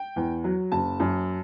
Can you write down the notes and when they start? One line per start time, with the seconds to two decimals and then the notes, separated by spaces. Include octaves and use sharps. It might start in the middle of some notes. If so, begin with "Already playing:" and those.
Already playing: G5
0.16 E2
0.44 F#3
0.72 F#1 A5
1.00 F#2